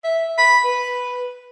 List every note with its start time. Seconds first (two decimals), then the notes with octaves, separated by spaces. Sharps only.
0.04 E5
0.38 B5
0.64 B4